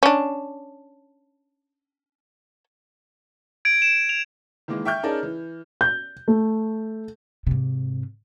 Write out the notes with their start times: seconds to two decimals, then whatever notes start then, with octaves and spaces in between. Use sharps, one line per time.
0.03 C#4 D4
3.65 G#6 D7
3.82 E7
4.09 F7
4.68 D#3 E3 G#3 A#3
4.85 E5 G5 C#6 F6 G6
5.03 C#4 D#4 G#4 A#4 D5 A5
5.23 E3
5.81 G6
6.28 A3
7.47 G#2 C3